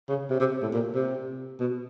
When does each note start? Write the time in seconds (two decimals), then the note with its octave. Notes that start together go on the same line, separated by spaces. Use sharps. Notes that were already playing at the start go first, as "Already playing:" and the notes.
0.09 C#3
0.30 C3
0.40 C3
0.62 A2
0.73 A#2
0.95 C3
1.59 B2